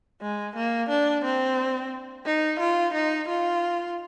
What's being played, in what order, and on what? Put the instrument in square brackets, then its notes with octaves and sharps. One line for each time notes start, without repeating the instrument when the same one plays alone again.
[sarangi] G#3
A#3
D4
C4
D#4
F4
D#4
F4